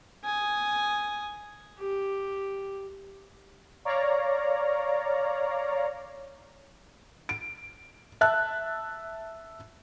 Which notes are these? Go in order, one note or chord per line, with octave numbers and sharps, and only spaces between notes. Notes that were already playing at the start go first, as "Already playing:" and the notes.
G#5 D#6
G4
C#5 D5 F5 A#5
D7
E5 A5 F#6